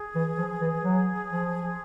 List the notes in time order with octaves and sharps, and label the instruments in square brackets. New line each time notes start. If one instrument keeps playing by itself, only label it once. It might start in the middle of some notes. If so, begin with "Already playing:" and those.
Already playing: [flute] G#4
[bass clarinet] E3
F3
E3
F#3
F3